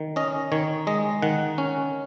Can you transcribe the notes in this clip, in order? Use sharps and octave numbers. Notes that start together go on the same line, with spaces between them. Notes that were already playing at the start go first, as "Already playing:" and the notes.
Already playing: D#3
C#4 D#5
D#3 C#5
G#3 D#5
D#3 F#5
C#4